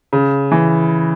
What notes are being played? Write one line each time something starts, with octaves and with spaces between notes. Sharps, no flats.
C#3
E3